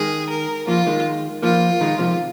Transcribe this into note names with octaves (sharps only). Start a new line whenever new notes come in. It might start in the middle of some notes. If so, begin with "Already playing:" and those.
Already playing: D#3 G#3 G#4
A#4
F3 A#3 F4
D#3 G#3
F3 A#3 F4
D#3 G#3
C3 F3